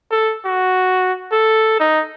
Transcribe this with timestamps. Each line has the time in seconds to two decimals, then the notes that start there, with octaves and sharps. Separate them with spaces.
0.11 A4
0.45 F#4
1.32 A4
1.80 D#4